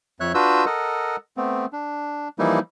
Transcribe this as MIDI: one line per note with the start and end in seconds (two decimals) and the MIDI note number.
0.20 0.32 41
0.20 0.32 73
0.20 0.32 76
0.20 0.32 90
0.34 0.65 62
0.34 0.65 65
0.34 0.65 66
0.34 0.65 71
0.34 0.65 88
0.34 0.65 91
0.66 1.16 69
0.66 1.16 70
0.66 1.16 75
0.66 1.16 78
1.37 1.66 57
1.37 1.66 59
1.37 1.66 60
1.73 2.28 62
2.39 2.59 52
2.39 2.59 53
2.39 2.59 55
2.39 2.59 58
2.39 2.59 63
2.39 2.59 64